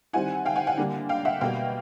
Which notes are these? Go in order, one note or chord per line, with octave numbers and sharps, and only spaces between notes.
D#3 G3 C4 E4 F#5 G#5
F5 G5
F#5 G#5
F#5 G#5
D3 G3 A#3 D4
F5 G5
E5 F#5
B2 G3 A#3 F5 G5